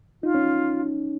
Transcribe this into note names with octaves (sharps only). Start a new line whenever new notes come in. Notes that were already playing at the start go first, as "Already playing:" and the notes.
D#4 F4
C#4